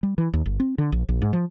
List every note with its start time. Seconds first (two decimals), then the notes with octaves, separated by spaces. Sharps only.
0.03 G3
0.18 E3
0.33 D#2
0.46 G1
0.60 C4
0.78 D3
0.92 A#1
1.09 A#1
1.22 G#2
1.33 F3